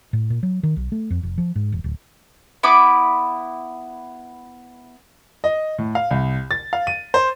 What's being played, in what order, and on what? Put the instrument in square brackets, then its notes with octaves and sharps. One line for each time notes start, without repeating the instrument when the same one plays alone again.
[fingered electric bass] A2
A#2
F#3
D#3
B1
A3
F2
F1
F3
G#2
E1
D1
[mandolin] B3 E4 B5 D6
[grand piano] D#5
A2
F5
C2
A6
F5
D#7
C5